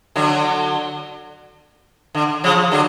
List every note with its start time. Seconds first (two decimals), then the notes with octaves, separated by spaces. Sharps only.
0.16 D3 F#3
2.15 D3
2.44 C#3 F3
2.72 D3 F#3